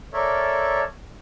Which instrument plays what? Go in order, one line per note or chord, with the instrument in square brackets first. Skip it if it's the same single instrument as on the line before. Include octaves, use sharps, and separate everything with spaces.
[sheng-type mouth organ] A4 A#4 C#5 D5 E5